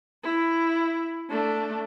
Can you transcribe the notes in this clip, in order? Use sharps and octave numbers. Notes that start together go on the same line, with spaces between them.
E4
A3 D4